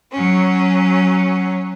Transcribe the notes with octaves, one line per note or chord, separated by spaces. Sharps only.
F#3 C#4